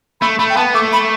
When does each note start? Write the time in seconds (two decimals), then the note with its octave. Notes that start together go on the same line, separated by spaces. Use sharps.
0.21 A3 B5
0.39 A3 B5
0.50 G5
0.57 B3 A5
0.74 A3 D6
0.93 B5